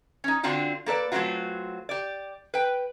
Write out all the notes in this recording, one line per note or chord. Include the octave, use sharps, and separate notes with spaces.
C#4 D#4
D3 C4 D4 F4 F#4
A#3 A4 B4 D5
F#3 A3 A#3 C4 F4 F#4
G4 D5
B4 G5